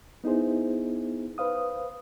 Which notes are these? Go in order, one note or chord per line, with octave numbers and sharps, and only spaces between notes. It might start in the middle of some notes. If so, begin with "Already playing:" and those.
B3 D#4 E4 G#4 C5
B4 C5 F5 D#6